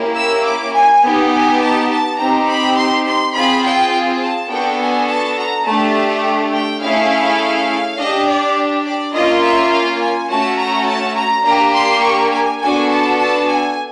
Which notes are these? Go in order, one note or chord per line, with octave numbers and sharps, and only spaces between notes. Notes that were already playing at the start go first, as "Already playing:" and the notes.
Already playing: A#3 C#4 E4 G4
E6
D6
G#5
B3 D#4 G4
G#5
A5
A5
C4 D#4 G4 A#5
B5
C6
C6
C4 F4 G#4 B5
G5
A5
B3 D4 F#4 A4 G5
G#5
A5
A#5
A3 D4 G4 A5
G5
A3 C#4 E4 G#4 F5
D4 G4 D#5
D5
D5
A#3 C#4 F4 D#5
E5
F5
G#5
A3 C#4 F#4 A5
A#5
A5
A#5
A#3 D4 G4 A#5
C6
C#6
G#5
B3 D4 F#4 A4 G#5
A5
A5
G#5